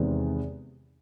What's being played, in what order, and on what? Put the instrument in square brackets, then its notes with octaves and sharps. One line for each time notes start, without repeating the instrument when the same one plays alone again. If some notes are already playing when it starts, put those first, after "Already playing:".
Already playing: [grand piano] E2 C3 D#3 G#3 B3